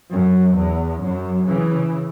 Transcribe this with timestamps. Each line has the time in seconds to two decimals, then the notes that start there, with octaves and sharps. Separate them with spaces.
0.12 F#2
0.57 E2
1.02 F#2
1.47 C#3 E3